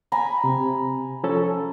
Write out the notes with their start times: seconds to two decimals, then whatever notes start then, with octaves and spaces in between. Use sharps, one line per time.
0.12 G#5 A#5 B5
0.44 C3
1.24 F3 C#4 A4